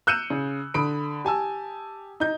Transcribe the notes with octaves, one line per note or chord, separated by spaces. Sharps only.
E6 F#6 G6 C#7 D#7 E7
C#3
D3 B5 D#6 D7
G4 G#5 A5 E6
D#4 G6